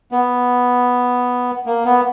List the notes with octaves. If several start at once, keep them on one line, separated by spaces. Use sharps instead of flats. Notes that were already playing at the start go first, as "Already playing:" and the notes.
B3
A#3
B3